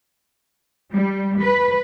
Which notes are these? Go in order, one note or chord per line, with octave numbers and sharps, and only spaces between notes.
G3
B4